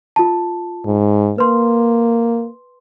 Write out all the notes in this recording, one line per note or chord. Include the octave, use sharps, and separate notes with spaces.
F4 A5
G#2
A#3 B4 C6